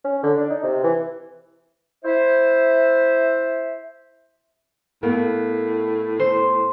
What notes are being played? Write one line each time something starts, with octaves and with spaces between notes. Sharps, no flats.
C#4
D3
D4
D#4
C3
E3
E4 C5 E5
A2 A#3 B3
C5